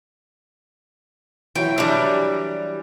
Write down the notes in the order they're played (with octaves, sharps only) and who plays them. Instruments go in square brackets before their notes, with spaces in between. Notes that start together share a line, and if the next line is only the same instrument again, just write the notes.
[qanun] E3 F#3 [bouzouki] G5
[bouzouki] E3 G3 [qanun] D4 A#4